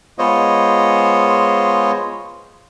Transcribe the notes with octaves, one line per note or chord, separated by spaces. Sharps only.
G#3 B3 F4 C5 C#5 D#5